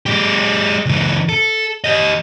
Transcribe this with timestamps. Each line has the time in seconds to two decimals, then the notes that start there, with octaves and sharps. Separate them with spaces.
0.06 G#3 G4
0.86 C#2 E3
1.29 A4
1.84 G4 D#5